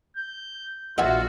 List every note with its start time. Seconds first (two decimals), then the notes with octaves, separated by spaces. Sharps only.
0.17 G6
0.98 A#1 F4 F#4 D#5 E5 F#5 G#5